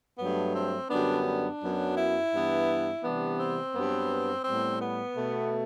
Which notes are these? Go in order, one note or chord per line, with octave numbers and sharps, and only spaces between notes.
G2 F#3 A3 B3
C4
F#2 D3 G3 B3 D4
D4
F#2 F#3 B3
E4
G2 E3 B3
C3 E3 G3 B3 D4
C4
G2 F#3 B3
A2 G3 B3 C4
B3
B2 A3